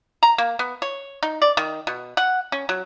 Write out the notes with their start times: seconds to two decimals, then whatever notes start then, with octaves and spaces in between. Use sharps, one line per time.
0.23 A#5
0.38 A#3
0.59 B3
0.82 C#5
1.23 D#4
1.42 D5
1.57 D#3
1.87 B2
2.17 F#5
2.52 C#4
2.69 F#3